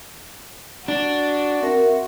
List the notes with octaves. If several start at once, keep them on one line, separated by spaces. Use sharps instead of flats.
D4 F#4
C4 A#4 E5